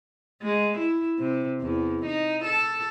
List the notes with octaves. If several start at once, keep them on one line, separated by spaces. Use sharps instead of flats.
G#3
E4
C3
E2
D#4
A4